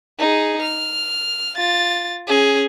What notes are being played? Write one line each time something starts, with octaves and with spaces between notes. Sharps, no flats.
D#4 G#4
F6
F4 A6
C#4 G#4